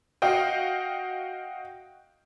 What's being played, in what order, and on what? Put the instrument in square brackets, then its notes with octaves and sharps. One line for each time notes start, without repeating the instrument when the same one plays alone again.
[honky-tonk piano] F#4 D#5 F5 G5